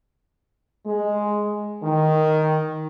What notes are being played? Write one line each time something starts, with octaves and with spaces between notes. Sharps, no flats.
G#3
D#3